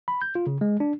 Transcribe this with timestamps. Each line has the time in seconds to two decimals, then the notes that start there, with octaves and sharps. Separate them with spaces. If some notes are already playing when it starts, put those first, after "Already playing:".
0.08 B5
0.22 G6
0.35 F4
0.47 C#3
0.61 G#3
0.80 D4